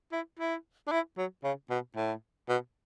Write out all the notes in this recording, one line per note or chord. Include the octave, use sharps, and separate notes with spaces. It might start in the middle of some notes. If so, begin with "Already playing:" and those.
E4
E4
D4
E4
F#3
C#3
B2
A2
B2